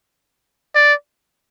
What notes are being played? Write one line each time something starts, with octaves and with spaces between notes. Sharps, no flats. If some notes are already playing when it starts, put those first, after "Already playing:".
D5